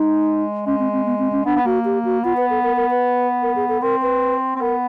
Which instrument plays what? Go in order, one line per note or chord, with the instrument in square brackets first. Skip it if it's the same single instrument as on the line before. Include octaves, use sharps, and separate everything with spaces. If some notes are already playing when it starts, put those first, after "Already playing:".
Already playing: [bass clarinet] G#3 [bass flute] D#4
[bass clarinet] G#3 [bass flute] C#4
[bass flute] C4
C4
B3
C4
C#4
[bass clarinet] B3 [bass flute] D4
[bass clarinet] B3
[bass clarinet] A#3 [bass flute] F#4
[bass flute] G4
F#4
[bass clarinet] B3 [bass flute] F4
[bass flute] B4
A4
A#4
A#4
B4
A#4
G#4
A4
[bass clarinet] C4 [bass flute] A#4
[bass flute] B4
[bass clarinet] C4
[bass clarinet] B3 [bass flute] A#4